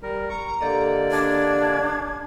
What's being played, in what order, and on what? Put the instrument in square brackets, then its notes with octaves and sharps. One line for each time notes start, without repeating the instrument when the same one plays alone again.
[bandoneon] G3 A#4
[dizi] A#5 [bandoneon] C#6
[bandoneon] D3 A#3 D5 [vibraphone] G4 A4 D#5
[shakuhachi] D4 [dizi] G#6